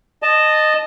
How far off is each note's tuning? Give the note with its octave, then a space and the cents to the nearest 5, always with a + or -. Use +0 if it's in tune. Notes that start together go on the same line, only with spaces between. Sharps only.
D#5 -15 A5 +0